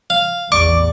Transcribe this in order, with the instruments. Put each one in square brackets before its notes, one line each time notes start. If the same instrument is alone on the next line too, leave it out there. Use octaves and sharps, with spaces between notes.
[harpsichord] F5
[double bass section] A1 E2 [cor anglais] D5 [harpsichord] C#6 [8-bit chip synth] D6